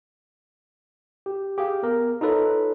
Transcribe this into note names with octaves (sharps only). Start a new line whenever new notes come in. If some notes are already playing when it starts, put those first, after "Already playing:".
G4
G4 G#4 F5
B3 A#4
D#4 F4 A4 B4 C#5